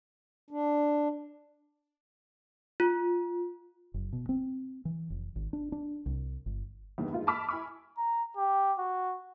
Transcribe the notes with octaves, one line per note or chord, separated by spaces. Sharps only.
D4
F4
F#1
B2
C4
E3
F1
G#1
D4
D4
C2
G1
E2 G2 D#3
G#2 F4
A5 B5 D6 F6 B6
E4 G#5 B5 C#6 D6
A#5
G4
F#4